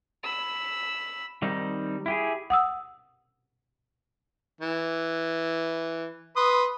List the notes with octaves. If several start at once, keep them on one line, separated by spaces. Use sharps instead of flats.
B5 E6
D#3 G3 C4 D#4
E4 G4 G#4
F#5 D#6 E6
E3
B4 C6 D#6